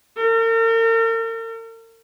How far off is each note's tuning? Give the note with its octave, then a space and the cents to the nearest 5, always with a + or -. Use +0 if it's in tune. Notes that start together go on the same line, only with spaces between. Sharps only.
A#4 -40